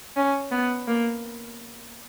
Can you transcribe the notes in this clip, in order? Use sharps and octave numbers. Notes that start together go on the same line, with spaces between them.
C#4
B3
A#3